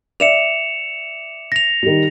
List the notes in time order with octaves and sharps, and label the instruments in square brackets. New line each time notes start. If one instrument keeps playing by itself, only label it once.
[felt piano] D5 E5 [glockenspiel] C#7 E7 F7
[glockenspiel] A#6 F7
[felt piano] D#3 G3